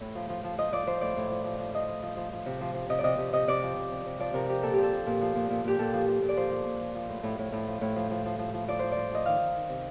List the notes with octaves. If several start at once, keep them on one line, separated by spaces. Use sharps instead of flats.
A2
F3
F3
F3
F3 D#5
F3 D5
F3 C5
A2 D5
A2
F3
F3
F3
F3 D#5
F3
F3
F3
F3
C3
F3
F3
C3 D#5
D5
C3 D#5
C3
C3 D#5
C3 D5
F3
C3
C3
C3
F3 D5
C3 A#4
F3 G4
A#2 A4
F3 G4
A4
F3
A#2
F3
A#2
A#2
A#2 G4
A#2 A4
F3
F3
A#2
D5
F3 C5
F3
A#2
F3
F3
A2
A2
A2
A2
F3
A2
F3
F3
F3
F3
F3
F3 D5
F3 C5
F3 D5
F3 D#5
D#3 F5
D#3
D#3
C3